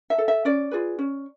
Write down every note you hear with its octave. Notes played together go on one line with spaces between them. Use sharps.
E5
A4
E5
C#4 D5
F4 G#4 B4
C#4